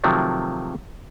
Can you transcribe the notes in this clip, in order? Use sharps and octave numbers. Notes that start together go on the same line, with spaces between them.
C3 D#3 F3 F#3 A3